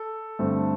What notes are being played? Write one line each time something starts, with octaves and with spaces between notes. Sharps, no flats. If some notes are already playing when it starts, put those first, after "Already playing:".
Already playing: A4
G2 D3 A3 C4